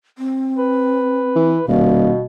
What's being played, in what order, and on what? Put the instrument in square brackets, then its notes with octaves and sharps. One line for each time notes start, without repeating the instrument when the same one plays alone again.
[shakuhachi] C4
[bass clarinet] B4
[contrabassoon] E3
[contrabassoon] D#1 [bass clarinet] B2 [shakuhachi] F5